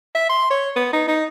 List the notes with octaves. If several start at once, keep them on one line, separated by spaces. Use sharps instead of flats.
E5
C6
C#5
B3
D#4
D#4